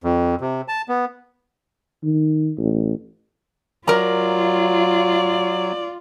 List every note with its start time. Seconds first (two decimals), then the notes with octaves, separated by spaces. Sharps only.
0.04 F2
0.41 C3
0.68 A5
0.89 B3
2.03 D#3
2.58 A1
3.88 F#3 F4 A#4 D5 A#5